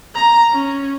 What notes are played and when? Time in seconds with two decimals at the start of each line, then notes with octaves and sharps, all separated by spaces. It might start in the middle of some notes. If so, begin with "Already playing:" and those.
0.15 A#5
0.51 C#4